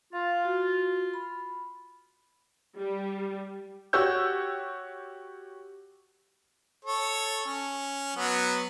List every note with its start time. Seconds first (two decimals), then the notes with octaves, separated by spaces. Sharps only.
0.13 F4 F5
0.45 F#4
1.14 B5
2.77 G3
3.93 F#4 G4 C#5 E6 G6
6.85 A4 C#5
7.46 C#4
8.16 F#3 B3